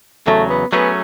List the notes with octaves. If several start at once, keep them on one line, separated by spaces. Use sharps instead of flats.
E2 C#3 F#3 A3
B3
F#3 A3 B3 C#4 G#4